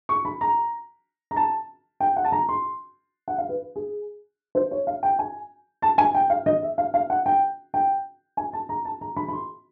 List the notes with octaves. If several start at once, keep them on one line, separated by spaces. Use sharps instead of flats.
C#6
B5
A#5
A#5
A5
G5
F#5
A5
A#5
C6
F#5
F5
B4
G#4
C5
C#5
F5
G5
G#5
A5
G#5
G5
F5
D#5
E5
F5
F5
F#5
G5
G5
G#5
A5
A#5
A5
A#5
B5
B5
C6